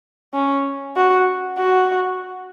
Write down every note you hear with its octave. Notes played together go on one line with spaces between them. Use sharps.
C#4
F#4
F#4